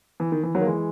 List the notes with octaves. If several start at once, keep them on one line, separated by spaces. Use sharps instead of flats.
E3
D#3
E3
D#3 F#3
A#3
E3 G#3